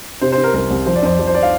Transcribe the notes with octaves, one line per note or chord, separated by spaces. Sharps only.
C3 C5
C5
C3
A#4
C2 A#4
C2
F3 C5
D5
F2 C5
F3
C5
D5
F5